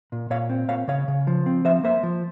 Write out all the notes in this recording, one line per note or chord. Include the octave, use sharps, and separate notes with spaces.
A#2
A#2 C#5 F5
C4
A#2 C#5 F5
C#3 C#5 F5
C#3
F3
C4
F3 C5 E5
A#3 C5 E5
F3